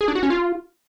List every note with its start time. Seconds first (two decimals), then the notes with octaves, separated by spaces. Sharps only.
0.01 G#4
0.08 D4
0.15 F#4
0.23 C#4
0.30 F4